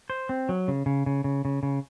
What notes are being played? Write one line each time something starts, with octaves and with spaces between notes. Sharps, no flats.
C5
C4
F#3
C#3
C#3
C#3
C#3
C#3
C#3